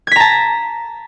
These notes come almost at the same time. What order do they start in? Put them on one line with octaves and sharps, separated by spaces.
G#6 B6 A#5 A5